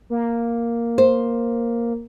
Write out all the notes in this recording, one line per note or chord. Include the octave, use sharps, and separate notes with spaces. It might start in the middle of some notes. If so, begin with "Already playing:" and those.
A#3
C5